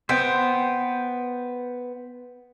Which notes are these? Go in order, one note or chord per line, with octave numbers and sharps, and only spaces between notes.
B3 C5 G5